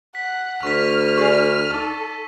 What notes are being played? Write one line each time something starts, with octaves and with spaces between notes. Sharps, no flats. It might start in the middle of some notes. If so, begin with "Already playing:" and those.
F#5 B6
D2 C#6 F6 B6
G#4 D5 G#5 C#6
D#4 A4